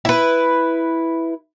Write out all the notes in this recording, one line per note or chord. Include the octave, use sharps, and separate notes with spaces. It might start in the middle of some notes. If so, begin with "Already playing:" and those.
E4 B4